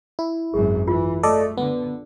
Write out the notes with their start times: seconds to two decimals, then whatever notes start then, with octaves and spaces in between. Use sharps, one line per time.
0.19 E4
0.54 G#1 F#2 G#4
0.88 E3 F4
1.23 A3 A4 D5 D#5
1.58 D3 B3